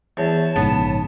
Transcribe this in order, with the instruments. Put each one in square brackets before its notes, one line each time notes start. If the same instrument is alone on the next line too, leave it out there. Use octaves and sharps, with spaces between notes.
[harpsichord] E2 [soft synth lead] C#5 [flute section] A5
[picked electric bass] A#1 G#2 C#3 [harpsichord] B3